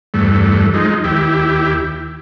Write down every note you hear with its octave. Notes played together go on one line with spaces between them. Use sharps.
E2 G2 A3
F3 G#3 D#4
D#2 E4 G4